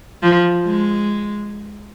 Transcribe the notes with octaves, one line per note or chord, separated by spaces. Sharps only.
F3
G#3